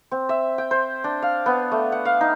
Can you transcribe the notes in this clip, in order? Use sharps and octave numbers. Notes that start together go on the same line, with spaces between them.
C4
E5
G5
C5
D4
F5
B3
A3
F#5
F5
D#4